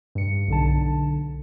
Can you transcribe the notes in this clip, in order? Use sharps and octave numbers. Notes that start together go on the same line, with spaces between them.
G2 C#7
B1 D3 A5